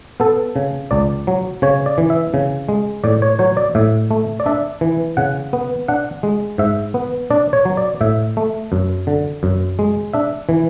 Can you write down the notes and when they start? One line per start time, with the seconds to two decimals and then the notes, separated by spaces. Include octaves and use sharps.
0.20 B3 A4
0.56 C#3
0.91 C#2 D5
1.27 F#3
1.62 C#3 C#5
1.86 D5
1.98 E3
2.10 E5
2.34 C#3
2.69 G#3
3.04 A2 D5
3.22 C#5
3.39 F#3 C#5
3.57 D5
3.75 A2 E5
4.11 A3
4.40 D5
4.46 D4 E5
4.81 E3
5.17 C#3 F#5
5.53 B3
5.88 D4 F#5
6.23 G#3
6.58 G#2 E5
6.94 B3
7.31 D4 D5
7.53 C#5
7.65 F#3
7.77 D5
8.01 A2 E5
8.37 A3
8.72 F#2
9.07 D3
9.43 F#2
9.79 G#3
10.13 D4 E5
10.49 E3